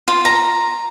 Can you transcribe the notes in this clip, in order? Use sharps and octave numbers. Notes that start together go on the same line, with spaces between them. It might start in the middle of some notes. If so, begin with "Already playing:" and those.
F4
A#5